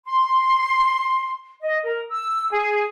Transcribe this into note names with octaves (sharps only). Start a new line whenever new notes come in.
C6
D#5
A#4
E6
G#4